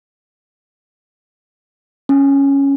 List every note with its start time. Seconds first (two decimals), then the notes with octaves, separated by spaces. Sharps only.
2.09 C#4